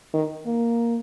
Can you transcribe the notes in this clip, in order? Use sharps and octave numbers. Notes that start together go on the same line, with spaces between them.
D#3
A#3